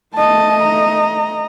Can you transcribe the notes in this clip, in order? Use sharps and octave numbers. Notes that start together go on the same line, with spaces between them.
A3 D#5 A5
A#5